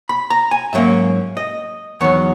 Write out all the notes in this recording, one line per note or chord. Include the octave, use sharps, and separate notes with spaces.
B5
A#5
G#5
G#2 F#3 A#3 C#4 E5
D#5
E2 D#3 F#3 C#5